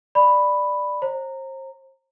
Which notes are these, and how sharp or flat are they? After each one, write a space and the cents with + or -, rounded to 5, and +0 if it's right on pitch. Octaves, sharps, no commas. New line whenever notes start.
D5 +10 B5 +0
C5 +35 A#5 -15